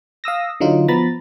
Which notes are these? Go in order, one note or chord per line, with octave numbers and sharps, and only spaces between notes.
F5 D#6 E6 A#6
D3 F#3 D#4 F4
F3 B3 A#5 B5 A6